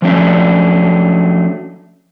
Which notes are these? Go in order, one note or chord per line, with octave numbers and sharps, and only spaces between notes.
F3 F#3 A3 C#4 D4